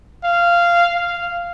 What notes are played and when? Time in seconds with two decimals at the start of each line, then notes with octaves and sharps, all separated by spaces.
0.24 F5
0.96 F5